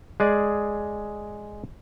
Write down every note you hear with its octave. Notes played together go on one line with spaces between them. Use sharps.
G#3 G#4 D5